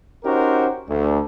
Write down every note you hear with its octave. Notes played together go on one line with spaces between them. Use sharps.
C#4 D#4 F#4 G4 A#4 C5
D2